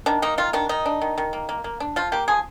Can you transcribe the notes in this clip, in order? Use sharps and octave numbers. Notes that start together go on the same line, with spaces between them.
D#3 D4
A#3 D#4
D#3 F4
D#3 D4
D#3 D#4
D4
D#3
D#3
A#3
A#3
A#3
D4
F3 F4
A#3 G4
F3 G#4